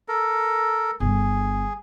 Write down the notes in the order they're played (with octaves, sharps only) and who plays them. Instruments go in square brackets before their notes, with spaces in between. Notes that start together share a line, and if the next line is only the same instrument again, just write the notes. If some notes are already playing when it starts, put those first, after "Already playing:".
[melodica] A4 A#4
[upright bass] G1 D3 [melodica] G#4